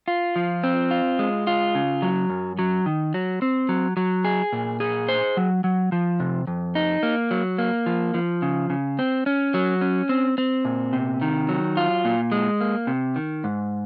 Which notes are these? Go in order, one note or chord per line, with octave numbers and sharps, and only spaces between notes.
F4
F3
C4
F4
G#3
F4
C#3
F#3
F#2
F#3
D#3
F#3
C4
F#3
F#3
G#4
A#2
G#4
C5
F#3
F#3
F3
C3
F2
D#4
A#3
F#3
A#3
F3
F3
C#3
C#3
C4
C#4
F#3
C#4
C4
C4
A#2
C3
D#3
F#3
F4
A#2
G#3
A#3
C3
D#3
G#2